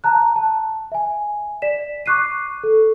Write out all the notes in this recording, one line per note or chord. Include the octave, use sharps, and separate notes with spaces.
A5 A#5 F#6
A5
E5 G#5
D5 B6 E7
C#6 D6 F#6 C7 D#7
A4